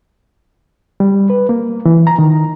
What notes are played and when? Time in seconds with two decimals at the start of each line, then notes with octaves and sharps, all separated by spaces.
1.00 G3
1.30 B4
1.49 A#3
1.86 E3
2.07 A#5
2.19 D#3